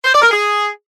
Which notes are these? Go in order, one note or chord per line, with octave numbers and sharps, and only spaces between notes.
C5
D5
A#4
G#4